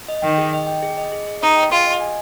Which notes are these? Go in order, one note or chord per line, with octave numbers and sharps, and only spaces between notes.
D#5
D#3 G5
G#4
D#5
G5
G#4
D#5
G#4
G#4
D#4 D#5
G5
F4 G#4
D#5
G#5